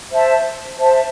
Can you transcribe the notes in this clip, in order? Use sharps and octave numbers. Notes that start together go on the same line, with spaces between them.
C5 E5 A5
C5 E5 A5